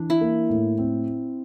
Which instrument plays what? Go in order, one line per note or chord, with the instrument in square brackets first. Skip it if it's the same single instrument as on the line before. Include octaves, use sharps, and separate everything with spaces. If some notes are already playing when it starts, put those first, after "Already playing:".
Already playing: [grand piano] E3 [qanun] D4
[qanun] E4
[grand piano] A#3
A2
C4